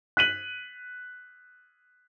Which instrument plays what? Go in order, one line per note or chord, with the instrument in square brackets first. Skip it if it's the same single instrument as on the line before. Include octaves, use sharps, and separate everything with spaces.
[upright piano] F#6 B6 D#7 F#7